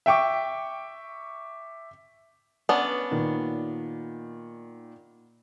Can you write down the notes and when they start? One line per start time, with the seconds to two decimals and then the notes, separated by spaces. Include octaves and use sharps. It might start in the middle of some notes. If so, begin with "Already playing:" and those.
0.06 E5 G5 C#6 D6
2.69 B3 C#4 D4
3.11 A#2 D#3